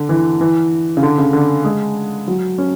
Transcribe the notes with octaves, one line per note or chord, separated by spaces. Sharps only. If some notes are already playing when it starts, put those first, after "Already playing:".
Already playing: D3
E3
E3
C#3
D3
C#3
D3
G#3
F#3
C#4